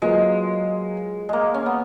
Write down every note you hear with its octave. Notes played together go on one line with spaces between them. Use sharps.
F#3 G#3 A#3 F4 G#4 B4
G#3 A#3
C#4
B3